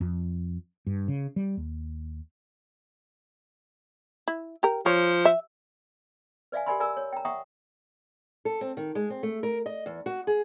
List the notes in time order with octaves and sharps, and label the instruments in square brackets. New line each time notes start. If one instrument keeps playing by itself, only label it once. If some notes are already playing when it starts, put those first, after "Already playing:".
[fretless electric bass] F2
G2
C#3
G3
D#2
[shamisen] E4
G4 A#4
[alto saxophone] F3 [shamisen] C#5
[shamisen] E5
[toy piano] B4 D5 E5 F5 G#5
G4 A#4 D5 G#5 B5 C6
A#4 D5 G#5 A#5 E6
C#5
G5 A#5
E5 F#5 G5 A#5 C#6 D#6
[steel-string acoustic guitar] A4
C4
D#3
G#3
C4
A3
A#4
D#5
E2
F#4
G#4